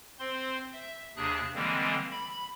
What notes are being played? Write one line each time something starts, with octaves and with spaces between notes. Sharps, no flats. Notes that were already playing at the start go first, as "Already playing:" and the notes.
C4 C5 C6
E5
D#2 C3 D4 G#4 F#6
D3 E3 G3 G#3 A#3 C4
B5